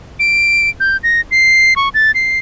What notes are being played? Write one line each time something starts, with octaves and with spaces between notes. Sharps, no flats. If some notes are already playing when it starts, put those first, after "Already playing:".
D7
G6
A#6
C7
C#6
A6
C7